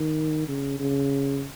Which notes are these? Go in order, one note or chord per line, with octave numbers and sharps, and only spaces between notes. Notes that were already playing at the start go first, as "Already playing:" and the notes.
Already playing: D#3
C#3
C#3